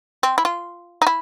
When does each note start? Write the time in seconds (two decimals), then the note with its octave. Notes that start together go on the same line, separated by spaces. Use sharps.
0.23 C4
0.38 E4
0.45 F4
1.02 D#4
1.07 E4